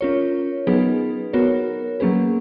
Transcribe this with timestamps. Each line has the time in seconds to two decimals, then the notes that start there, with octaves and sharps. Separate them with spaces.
0.01 C#4 F4 A#4 C#5
0.67 F#3 B3 D#4 G#4 B4
1.33 B3 F#4 A#4 C#5
2.00 F#3 A#3 C#4 G#4 B4